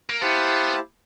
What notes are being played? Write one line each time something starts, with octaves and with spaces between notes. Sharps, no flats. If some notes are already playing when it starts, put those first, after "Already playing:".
A#3
B3 E4 G4 C5 F5 A5